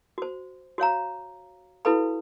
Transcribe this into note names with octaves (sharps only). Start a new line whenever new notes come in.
F#4 C5
F#4 C#5 F5 A#5
E4 F#4 A4 B4 F5 B5